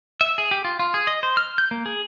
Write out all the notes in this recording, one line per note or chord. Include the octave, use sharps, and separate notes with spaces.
E5
G#4
G4
F4
F4
G#4
D#5
C5
F6
G6
A#3
G#4